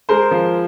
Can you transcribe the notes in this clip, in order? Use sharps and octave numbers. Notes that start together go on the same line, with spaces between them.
G#3 A#4 C5
F3